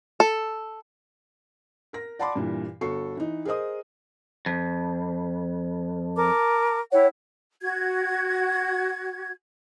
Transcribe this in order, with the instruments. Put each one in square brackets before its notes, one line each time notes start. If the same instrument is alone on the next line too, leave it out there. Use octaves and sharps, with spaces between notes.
[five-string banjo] A4
[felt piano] A#4 A#6
D5 F#5 A5 B5 C6 D6
G2 A#2 E3
G1 F#4 A4 C#6 C7
E3 D#4
G#4 A#4 C5 D#5 D#6
[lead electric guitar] F2
[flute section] A#4 A5 D6
[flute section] E4 F#5 G5 [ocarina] C#5
[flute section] F#4 G#6